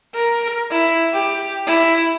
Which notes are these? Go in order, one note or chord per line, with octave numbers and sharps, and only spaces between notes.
A#4
E4
G4
E4